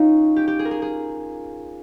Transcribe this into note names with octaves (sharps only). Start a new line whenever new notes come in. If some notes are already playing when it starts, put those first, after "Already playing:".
Already playing: C#4 D#4 F4
G4
G4
G#4
A#4
G#4
G#4